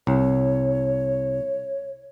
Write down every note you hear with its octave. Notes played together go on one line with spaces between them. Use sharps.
C2 C#5